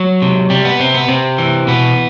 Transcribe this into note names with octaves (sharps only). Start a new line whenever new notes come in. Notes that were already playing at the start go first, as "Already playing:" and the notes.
Already playing: F#3
C3
C3 G3
B3
C3 C4
B3
C3 C4
E3
B2 B3